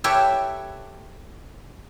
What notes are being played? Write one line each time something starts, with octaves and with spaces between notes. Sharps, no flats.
G4 A4 B4 C#5 E5 G5